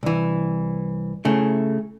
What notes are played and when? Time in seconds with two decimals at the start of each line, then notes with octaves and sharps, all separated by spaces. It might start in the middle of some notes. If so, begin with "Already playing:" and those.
0.03 C2 E3
1.25 C#3 A3 E4